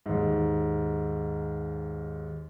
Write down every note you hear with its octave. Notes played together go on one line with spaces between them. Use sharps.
D#2 G#2